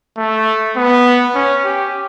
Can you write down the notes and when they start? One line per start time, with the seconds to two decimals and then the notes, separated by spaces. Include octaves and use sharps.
0.17 A3
0.77 B3
1.35 C#4
1.65 G4